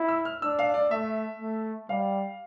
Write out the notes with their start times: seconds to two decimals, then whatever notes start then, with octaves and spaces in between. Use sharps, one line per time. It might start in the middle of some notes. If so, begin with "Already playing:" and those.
Already playing: E4
0.08 E6
0.25 F6
0.42 D4 E6
0.59 F5
0.74 D5
0.91 A3 E5
1.40 A3
1.89 G3 F5